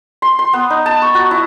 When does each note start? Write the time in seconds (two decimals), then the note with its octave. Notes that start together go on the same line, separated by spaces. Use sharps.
0.22 C6
0.39 C6
0.53 B3
0.70 D#4
0.86 A5
1.02 C#6
1.15 F#4
1.31 E4